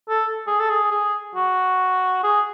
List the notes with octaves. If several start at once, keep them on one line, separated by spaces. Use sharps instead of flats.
A4
G#4
A4
G#4
G#4
F#4
G#4